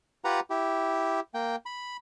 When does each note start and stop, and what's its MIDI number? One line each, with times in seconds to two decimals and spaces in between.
0.25 0.40 65
0.25 0.40 67
0.25 0.40 71
0.25 0.40 78
0.25 0.40 82
0.50 1.20 64
0.50 1.20 67
1.34 1.56 58
1.34 1.56 79
1.66 1.97 83